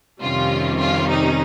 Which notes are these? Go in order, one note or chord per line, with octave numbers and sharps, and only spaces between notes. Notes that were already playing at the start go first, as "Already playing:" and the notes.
F2 C3 D#3 G3 C#4 F4
F4
D#4